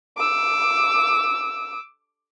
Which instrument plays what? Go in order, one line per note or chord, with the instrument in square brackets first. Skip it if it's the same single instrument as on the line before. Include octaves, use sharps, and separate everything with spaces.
[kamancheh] D6 E6